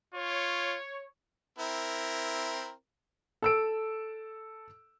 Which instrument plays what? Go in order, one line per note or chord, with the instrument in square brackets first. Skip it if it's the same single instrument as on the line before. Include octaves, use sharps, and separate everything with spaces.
[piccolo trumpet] F4 [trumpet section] C#5
[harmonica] C4 E4 A#4
[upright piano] A4 E6 D7